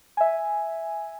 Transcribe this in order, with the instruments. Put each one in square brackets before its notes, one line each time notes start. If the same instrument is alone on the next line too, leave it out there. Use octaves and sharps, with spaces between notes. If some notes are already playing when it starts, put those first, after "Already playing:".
[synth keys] E5 G#5